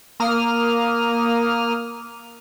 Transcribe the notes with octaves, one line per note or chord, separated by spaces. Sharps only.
A#3 D#6 F6